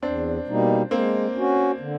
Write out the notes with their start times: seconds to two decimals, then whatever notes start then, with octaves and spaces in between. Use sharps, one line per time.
0.03 E2 C4 D4
0.47 B2 G3 A#3 D#4
0.91 G#3 A#3 C4
1.36 C#4 F#4
1.80 D3